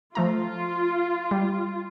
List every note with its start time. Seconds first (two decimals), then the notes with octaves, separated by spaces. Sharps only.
0.15 F3 A3 F4 A#5
1.31 G3